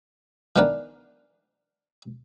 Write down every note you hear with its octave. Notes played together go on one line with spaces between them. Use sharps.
D#3 E3 B3 D4 A#4 B4